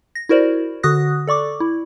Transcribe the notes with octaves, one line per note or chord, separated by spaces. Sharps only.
A#6
E4 F#4 A#4 C5 D5
D3 F#4 D#6 F#6 A#6
A4 D5 C#6 D6
E4